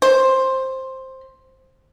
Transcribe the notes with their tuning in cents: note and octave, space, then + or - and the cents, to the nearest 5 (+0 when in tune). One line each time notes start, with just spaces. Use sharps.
C5 +10